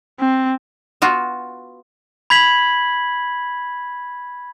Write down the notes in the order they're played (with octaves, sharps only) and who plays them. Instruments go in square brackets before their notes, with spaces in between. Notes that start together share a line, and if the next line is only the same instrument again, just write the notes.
[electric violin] C4
[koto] B3 F4 F#4
[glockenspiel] B5 G#6 B6 F#7